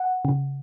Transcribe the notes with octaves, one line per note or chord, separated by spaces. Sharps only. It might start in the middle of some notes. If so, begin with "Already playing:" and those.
Already playing: F#5
C#3